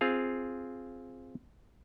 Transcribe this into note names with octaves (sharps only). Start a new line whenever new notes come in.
C4 F4 G#4 F5